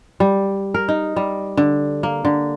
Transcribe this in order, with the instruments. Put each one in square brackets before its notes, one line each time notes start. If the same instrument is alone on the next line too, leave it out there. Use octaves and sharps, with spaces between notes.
[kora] G3
A#4
D#4
G3
D3
A#3
D3